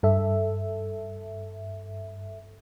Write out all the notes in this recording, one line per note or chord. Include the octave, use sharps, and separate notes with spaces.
G2 A4 E5